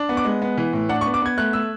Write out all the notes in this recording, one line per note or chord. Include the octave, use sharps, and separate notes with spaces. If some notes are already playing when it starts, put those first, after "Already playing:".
Already playing: D4
B3
D6
G#3
B3
E3
A2
D4 F#5
C#6
B3
D6
B3 G#6
A3 F#6
A3 E6